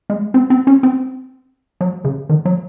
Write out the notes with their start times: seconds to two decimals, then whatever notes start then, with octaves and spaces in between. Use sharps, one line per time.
0.10 G#3
0.34 C4
0.50 C4
0.67 C#4
0.83 C4
1.81 F#3
2.04 C#3
2.29 D#3
2.45 F#3